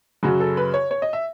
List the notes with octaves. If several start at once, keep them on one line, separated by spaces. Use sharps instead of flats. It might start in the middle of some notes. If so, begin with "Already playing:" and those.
F#2 C#3 F#3 F#4
A4
B4
C#5
C#5
D#5
E5